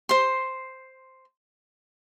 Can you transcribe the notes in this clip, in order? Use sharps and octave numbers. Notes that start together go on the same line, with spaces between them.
C5 C6